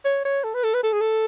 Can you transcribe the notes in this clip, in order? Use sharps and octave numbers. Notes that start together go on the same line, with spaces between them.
C#5
C#5
A4
B4
A4
B4
A4
G#4
A4